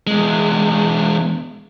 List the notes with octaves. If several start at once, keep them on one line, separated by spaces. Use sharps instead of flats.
E2 G#3